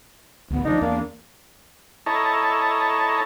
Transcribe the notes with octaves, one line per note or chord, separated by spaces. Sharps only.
A1 D2 B3
D2 D3 F3 D4 D#4
E2 A#3
E4 A4 C#5 D#5 A5 A#5